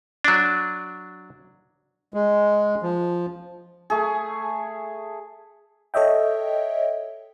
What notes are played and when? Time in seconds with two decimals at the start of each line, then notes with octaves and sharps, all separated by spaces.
0.24 F#3 D4
2.14 G#3
2.82 F3
3.90 A3 G#4
5.94 A4 C#5 D#5 E5 G5